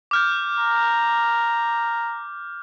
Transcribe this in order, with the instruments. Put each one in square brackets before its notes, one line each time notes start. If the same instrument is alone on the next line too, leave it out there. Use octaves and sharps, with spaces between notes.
[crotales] D6 F6 G6
[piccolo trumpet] A#5